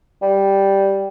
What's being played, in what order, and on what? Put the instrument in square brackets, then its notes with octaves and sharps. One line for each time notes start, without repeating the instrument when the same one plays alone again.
[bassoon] G3